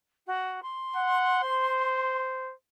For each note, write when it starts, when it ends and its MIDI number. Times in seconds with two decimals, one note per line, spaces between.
0.27 0.60 66
0.62 2.19 84
0.96 1.40 78
1.43 2.54 72